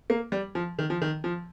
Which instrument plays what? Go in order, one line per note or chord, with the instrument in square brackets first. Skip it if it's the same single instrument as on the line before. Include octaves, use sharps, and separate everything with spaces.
[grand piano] A#3
G3
F3
D#3
F3
D#3
F3